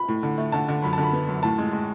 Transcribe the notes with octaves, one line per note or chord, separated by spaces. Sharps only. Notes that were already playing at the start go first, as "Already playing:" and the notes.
Already playing: B5
A2
D3
A3
D3 A5
D3
F#2 B5
D3 A5
B5
B3
F#2
A2 A5
G#3
G#3